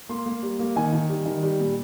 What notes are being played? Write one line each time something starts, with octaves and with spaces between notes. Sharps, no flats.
A#3 C6
A#3
G3
A#3
D#3 G#5
D#3
G3
D#3
G3
A#2